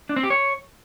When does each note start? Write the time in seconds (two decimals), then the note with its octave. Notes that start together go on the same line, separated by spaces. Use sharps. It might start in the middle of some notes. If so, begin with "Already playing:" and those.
0.09 D4
0.16 C4
0.23 G4
0.30 C#5